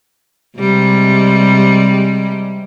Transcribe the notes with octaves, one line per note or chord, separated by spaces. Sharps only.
C3 G3 G#3